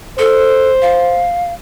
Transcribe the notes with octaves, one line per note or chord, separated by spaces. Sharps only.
A4 C5
F5